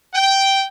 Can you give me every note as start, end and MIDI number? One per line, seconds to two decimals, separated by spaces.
0.14 0.65 79